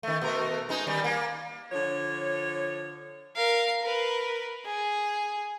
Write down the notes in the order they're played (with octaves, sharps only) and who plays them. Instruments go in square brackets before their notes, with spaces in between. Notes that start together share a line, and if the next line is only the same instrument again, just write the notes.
[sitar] D#3 A3
B2 A3 A#4
G#3 D#4
D#3 G3
A#3
[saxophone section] D3 F3 C#5
[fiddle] A#4 F5
A#4 B4
G#4